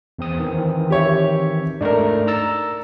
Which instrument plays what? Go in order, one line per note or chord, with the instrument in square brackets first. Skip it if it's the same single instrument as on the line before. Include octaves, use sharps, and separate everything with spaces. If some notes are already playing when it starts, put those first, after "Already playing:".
[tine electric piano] E2 C4 D#6
D#3 E3 C4
[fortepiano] G4 C#5 E5
[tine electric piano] G#2 A3 D#4 [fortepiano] D4 A#4
[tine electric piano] A#5 E6 A6